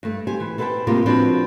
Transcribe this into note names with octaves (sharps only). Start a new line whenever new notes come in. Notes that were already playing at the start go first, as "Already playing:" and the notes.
G2 A3
G4 C5 G#5
E3
A4 B4 C5 F#5 G5 A5
A2 C3 G#3 A#3 F4 G4
F3 C4 D4 F#4 B4